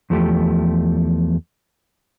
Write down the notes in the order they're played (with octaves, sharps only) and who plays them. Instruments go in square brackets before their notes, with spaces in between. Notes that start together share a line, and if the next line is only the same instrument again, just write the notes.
[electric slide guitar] E2 F3 A3 G4